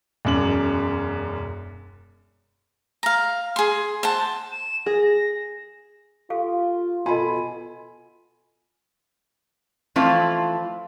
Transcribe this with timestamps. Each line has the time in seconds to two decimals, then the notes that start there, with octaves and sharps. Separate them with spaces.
0.25 E1 F#2 F#7
3.03 F5 A#5
3.56 G#4 C6
4.03 C5 F#5 A5
4.52 E7
4.86 G#4 A#6
5.04 A#6
6.30 F4 G4 A4 F5
7.06 B2 F4 A4 D#5 G#5 B5 C6
9.96 E3 F3 A3 C4 E4 F4